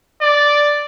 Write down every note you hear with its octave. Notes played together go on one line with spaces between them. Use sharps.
D5